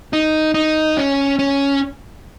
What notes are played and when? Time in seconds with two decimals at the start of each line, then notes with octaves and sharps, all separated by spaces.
0.13 D#4
0.54 D#4
0.97 C#4
1.39 C#4